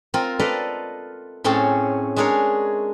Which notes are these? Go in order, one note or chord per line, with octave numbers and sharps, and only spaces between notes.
C4 F4 A#4
A4 B4 D5 D#5 F5 A#5
A2 C4 C#4 G#4 A5
G#3 D4 G#4 A#4 C#5